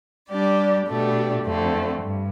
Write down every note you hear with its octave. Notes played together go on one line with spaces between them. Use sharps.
G3 D4 G4 D5
B2 A3 D4 G4
F2 D3 A3 C4
G2